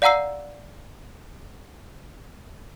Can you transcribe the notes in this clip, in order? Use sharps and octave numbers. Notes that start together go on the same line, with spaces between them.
D5 F5 F#5 A#5 E6 C7